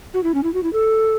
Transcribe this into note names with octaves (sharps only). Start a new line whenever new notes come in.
F#4
E4
C#4
E4
F#4
E4
A4